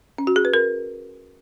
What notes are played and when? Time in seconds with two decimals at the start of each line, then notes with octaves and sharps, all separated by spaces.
0.18 C#4
0.27 F#4
0.36 G#4
0.45 B4
0.54 A#4